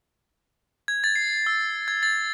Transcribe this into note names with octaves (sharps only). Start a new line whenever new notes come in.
G#6
A6
C7
E6
G#6
A6